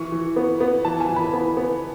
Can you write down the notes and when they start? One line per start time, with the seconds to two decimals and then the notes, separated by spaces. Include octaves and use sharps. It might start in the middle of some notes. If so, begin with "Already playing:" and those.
Already playing: E3 C#6
0.12 E3
0.36 B3
0.61 B3
0.85 E3 A5
1.00 G#5
1.09 E3
1.16 B5
1.33 B3
1.57 B3